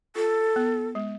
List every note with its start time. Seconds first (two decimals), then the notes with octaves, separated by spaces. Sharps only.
0.16 F4 A4
0.56 B3
0.95 G#3